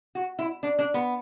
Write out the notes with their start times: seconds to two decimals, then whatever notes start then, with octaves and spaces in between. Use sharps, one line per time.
0.15 F#4
0.39 E4
0.63 D4
0.79 D4
0.94 B3